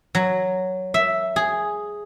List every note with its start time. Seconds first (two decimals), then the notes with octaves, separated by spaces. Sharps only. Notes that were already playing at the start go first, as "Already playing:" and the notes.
0.15 F#3
0.94 E5
1.36 G#4